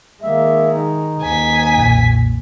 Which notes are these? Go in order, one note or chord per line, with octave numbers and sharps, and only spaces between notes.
D#3 G#3 A#3 E5
D#4
D#2 G#5 B6
B1 F2 A#2